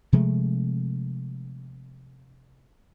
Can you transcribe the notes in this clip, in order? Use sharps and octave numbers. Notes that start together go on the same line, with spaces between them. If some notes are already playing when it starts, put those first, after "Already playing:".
C3 F3 G#3 A3